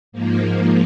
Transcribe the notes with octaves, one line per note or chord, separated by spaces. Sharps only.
G#2 F3 A#3